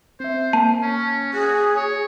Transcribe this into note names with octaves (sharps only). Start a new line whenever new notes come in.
C4 C5 E5
A#3 A5
C#4
F#4 G#4
C#5